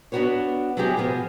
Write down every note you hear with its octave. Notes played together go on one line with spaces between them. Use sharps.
B3 D4 D#4 F#4 B4 C#5
F#3 B3 E4 G4 G#4
B2 F3 B3 G#4